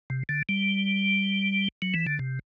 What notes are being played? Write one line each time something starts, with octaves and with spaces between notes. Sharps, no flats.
C3
D3
G3
F#3
E3
D3
C3